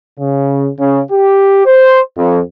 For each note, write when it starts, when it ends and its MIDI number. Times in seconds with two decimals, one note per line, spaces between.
0.19 0.68 49
0.78 1.01 49
1.11 1.65 67
1.66 2.00 72
2.18 2.40 41